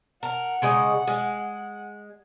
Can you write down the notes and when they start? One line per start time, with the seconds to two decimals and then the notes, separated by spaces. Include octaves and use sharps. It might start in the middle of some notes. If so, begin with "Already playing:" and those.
0.23 A#4 F#5
0.62 C#3 G#3 D#5
1.07 G#3